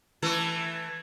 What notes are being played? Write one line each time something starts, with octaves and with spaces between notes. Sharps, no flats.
E3 A3 A4